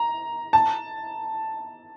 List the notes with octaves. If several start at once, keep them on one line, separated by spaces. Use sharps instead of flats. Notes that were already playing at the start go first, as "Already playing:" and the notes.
Already playing: A#5
A5